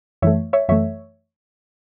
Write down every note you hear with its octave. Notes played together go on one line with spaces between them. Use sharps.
F#2 E3 A3 C#5 E5
C#5 E5
F#2 E3 A3 C#5 E5